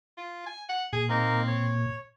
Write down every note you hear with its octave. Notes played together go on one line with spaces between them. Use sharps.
F4
G#5
F#5
A#2 G#4
A#3 C4 D#4 A#4
C#5